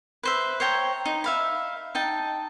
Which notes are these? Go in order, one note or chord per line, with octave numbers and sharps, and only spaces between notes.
B4 C5 E5
C5 C#5 G5 A#5
D#4
E5 F5 B5
D#4 G5 A5